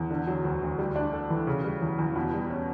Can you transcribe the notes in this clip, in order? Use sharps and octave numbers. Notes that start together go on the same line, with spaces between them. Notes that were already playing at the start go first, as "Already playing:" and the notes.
Already playing: E2
D3
F#3
D2
D2
G3
D4
A4
E3
C#3
G3
E2
E2
B2
G3
C#4